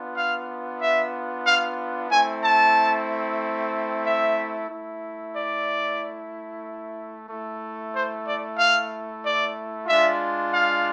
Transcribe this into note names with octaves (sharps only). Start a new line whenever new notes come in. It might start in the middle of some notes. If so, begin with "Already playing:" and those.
Already playing: B3 D4 F4
F5
E5
F5
A3 C4 E4 G#5
A5
E5
A3 E4
D5
A3 E4
C5
D5
F5
D5
G#3 D4 F4 E5
F5